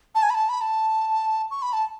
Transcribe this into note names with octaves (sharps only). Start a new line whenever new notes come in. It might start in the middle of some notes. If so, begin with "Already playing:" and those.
A5
G#5
B5
A5
B5
A5
C#6
B5
A5